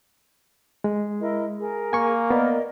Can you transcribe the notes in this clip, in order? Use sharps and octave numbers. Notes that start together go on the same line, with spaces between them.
G#3
E4 A#4 D#5
G#4 A#4
A#3 G#5 C#6
B3 A#4 D5 D#5